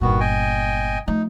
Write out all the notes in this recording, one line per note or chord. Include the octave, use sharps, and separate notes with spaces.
G1 A#2 D#3 B3 F#4
D#5 G5 G#5
F3 A3 D#4